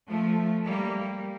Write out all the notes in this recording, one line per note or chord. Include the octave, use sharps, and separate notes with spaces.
F3 A3
G3 A#3